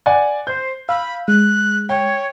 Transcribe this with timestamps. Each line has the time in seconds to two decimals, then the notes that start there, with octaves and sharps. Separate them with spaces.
0.06 D5 F#5 G#5
0.47 C5 G6
0.89 F5 B5 E6
1.28 G#3 F#6
1.89 C#5 G5